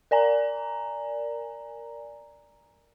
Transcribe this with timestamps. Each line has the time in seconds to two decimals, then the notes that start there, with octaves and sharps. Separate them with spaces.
0.11 A#4 D5 G#5 A#5